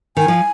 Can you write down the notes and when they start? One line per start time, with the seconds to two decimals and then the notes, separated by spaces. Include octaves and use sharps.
0.16 D#3 G#5
0.28 F3